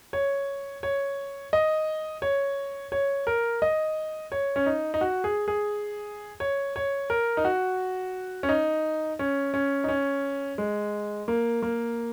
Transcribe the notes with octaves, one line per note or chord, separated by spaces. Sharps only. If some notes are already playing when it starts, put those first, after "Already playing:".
C#5
C#5
D#5
C#5
C#5
A#4
D#5
C#5
C#4
D#4
D#4
F#4
G#4
G#4
C#5
C#5
A#4
D#4
F#4
C#4
D#4
C#4
C#4
D#4
C#4
G#3
A#3
A#3